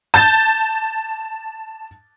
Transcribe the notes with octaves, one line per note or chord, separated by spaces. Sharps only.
A5 G6 A6